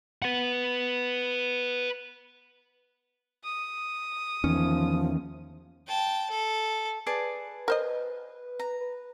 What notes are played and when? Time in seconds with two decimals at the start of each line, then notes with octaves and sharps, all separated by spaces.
0.22 B4 F#5
3.43 D#6
4.44 E2 D#3 F3 C#4
5.87 G5 A5
6.30 A4
7.07 G#4 B4 D5 A5
7.68 A#4 C5 D#5
8.60 A#5
8.81 B4